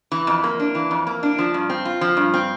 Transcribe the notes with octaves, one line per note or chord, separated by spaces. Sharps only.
E3
F2
A#3
D4
E3
F2
A#3
D4
F3
G2
C4
F4
F3
G2
C4